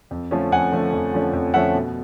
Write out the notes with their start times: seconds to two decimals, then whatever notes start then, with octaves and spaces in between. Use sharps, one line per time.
0.11 F2
0.31 D3 F3 A3 C#4
0.52 F2 F#5 G#5
0.72 D3 F3 A3 C#4
0.93 F2
1.13 D3 F3 A3 C#4
1.33 F2
1.54 D3 F3 A3 C#4 E5 F#5
1.74 B2